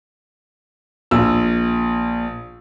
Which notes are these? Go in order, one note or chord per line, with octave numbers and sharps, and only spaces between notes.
A#1 E6